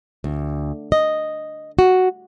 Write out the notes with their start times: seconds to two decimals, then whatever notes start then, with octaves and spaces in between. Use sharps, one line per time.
0.24 D2
0.92 D#5
1.79 F#4